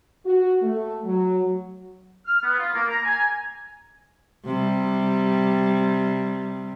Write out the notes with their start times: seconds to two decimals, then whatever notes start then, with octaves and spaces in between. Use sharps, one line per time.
0.24 F#4
0.62 A3
1.04 F#3
2.26 F6
2.43 B3
2.58 F4
2.74 A#3
2.89 A#5
3.04 G#5
4.45 C3 G3